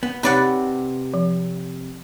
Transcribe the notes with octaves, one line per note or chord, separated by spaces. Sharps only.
B3
C3 D#4 B4 C#5 D5 F#5
F3